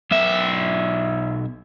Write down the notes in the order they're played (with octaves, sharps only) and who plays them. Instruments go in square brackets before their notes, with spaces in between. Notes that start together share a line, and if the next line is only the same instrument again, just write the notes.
[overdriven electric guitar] B1 E5